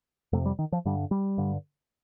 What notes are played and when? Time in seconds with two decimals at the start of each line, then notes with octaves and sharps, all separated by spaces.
0.33 F2 C3 A3
0.46 G3
0.59 D#3
0.72 F3
0.85 G2 D3 G3
1.11 G3
1.38 G2 D3